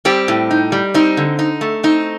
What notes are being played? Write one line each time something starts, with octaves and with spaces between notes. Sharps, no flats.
G3 C4 G4
A2
D#4
G3
C4 D#4
D3
D#4
A3
C4 D#4